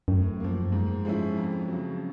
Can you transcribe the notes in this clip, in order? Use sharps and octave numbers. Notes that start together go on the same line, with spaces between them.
F#2 A2
F3 A#3
G#2
F3 G#3 C#4 E4
F2
C#3 F#3